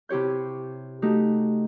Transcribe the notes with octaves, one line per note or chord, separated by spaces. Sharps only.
C3 E4 G4 C#5 G6
A3 D#4 F#4 G4